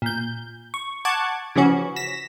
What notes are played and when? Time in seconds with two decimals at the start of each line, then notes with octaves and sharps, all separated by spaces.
0.02 A#2 G6
0.74 C#6
1.05 F#5 A5 C#6 D6 F#6 G#6
1.55 C#3 E3 F3 C#4 F#4
1.96 A#6 B6 E7